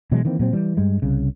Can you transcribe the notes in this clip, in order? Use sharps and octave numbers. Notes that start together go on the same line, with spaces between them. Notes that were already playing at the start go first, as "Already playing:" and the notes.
B2 E3 F#3 G#3
D#3 E3 A#3 C4
A#2 F#3 C4
E3 G3
G2 G3 G#3
C2 C#3